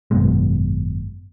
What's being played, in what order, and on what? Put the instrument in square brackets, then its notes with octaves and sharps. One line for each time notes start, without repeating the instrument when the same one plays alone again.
[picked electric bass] G#1 F#2 B2 G#3